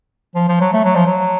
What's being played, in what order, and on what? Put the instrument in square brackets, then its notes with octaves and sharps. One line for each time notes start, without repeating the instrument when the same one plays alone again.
[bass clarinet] F3
F3
F#3
A3
F#3
F3
F#3